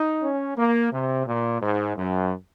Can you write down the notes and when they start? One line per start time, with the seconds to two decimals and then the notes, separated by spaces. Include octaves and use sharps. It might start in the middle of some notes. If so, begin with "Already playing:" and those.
Already playing: D#4
0.22 C#4
0.57 A#3
0.92 C3
1.27 A#2
1.62 G#2
1.96 F#2